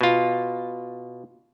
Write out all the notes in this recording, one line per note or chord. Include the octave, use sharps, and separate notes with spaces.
B2 F4